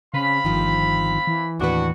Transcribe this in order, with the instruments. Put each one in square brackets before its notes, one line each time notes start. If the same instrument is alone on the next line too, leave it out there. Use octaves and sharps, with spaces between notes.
[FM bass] C#3 [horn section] C4 F5 B5
[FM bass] G1 [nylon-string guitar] D#3 F3
[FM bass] E3
[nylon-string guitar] D#2 A2 B4 [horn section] D4 F#4